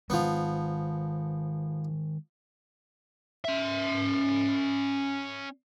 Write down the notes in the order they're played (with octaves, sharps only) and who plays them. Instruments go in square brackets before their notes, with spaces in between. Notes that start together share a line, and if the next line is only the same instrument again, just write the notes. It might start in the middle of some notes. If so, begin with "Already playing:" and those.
[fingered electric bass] D#3 G#3 [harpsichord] F3 B3
[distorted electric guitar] C#4 E5